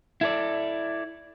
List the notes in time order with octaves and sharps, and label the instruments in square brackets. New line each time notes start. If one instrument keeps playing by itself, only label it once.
[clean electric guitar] E4 A4 D5